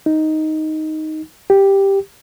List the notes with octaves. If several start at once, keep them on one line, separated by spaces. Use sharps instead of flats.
D#4
G4